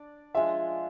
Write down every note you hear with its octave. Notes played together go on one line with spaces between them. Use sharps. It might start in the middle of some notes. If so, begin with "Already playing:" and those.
Already playing: D4 D5
F3 G#3 D4 F4 E5